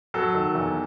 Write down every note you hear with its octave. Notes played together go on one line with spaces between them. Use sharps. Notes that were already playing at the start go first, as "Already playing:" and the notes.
F#3 A4
D#3
E2